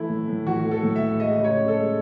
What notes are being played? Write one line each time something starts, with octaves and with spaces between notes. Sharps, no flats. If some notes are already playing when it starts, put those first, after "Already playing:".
Already playing: E3 A3 E4
A2
A2
E3 F#4
A3
A4
A2
E5
A2
G#3 D#5
D#5
C#3
C#5
C#3
A4
G#3